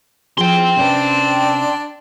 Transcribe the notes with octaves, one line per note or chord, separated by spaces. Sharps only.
F3 E4 G#4 G5 C6
C3 C#4 D4 B4